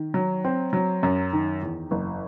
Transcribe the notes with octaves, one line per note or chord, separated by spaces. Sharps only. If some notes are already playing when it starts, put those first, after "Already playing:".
Already playing: D#3
F#3
C4
F#3
F#2
D#3
E2
F#1